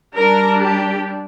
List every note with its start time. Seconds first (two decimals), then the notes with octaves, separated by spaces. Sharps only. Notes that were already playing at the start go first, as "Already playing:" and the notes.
0.15 G3 D4 A#4
0.62 G4